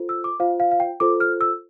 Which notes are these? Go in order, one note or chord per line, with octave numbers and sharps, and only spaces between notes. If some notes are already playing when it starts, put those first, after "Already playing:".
Already playing: F4 A4 C5
E6
D6
F4 C5 F5
F5
F5
G5
F4 A4 C5 D6
F6
E6